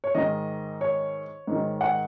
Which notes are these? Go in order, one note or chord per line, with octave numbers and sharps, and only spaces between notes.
C#5
G#2 D#3 D#5
C#5
G#2 D#3
F#5